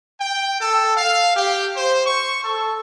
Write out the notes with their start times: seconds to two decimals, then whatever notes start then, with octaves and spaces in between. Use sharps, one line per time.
0.19 G5
0.59 A4
0.96 F5
1.36 G4
1.76 C5
2.06 C#6
2.44 A4